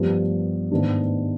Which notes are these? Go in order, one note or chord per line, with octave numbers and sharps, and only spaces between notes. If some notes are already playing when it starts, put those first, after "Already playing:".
Already playing: G2 F3 B3
G#2 D#3 B3 D4